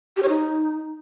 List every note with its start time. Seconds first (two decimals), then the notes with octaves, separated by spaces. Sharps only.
0.17 G4
0.23 C#5
0.29 D#4